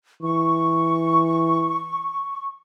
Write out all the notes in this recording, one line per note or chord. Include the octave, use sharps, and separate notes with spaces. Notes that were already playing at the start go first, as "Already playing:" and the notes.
E3 C#6